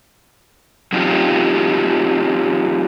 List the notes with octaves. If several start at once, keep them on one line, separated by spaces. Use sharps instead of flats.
F#3 C4 C#4 D#4 F4 G4